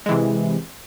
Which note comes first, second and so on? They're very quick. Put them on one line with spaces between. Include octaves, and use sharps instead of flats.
G#3 E3 C3